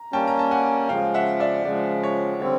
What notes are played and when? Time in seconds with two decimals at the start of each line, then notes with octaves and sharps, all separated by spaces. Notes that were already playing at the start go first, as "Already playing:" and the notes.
Already playing: A#5
0.13 G3 A#3 C#4 G5 A5
0.27 A#5
0.39 A5
0.51 F#5 G#5
0.89 C#3 F3 G#3 F5 G5
1.14 E5 F#5
1.40 D5 E5
1.65 C#3 F3 G#3 D5
2.03 C#5
2.42 D3 G3 C4 C#5